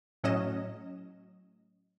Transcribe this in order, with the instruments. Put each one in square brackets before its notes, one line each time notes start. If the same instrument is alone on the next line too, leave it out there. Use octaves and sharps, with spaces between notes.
[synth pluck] A2 F#3 C#4 D#5 E7